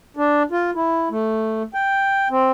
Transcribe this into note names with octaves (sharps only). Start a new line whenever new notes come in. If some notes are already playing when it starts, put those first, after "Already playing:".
D4
F4
E4
A3
G5
C4